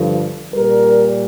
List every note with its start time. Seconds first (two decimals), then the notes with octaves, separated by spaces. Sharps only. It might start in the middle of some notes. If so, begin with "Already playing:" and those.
Already playing: G2 D3 F3
0.54 A#2 G3 A#4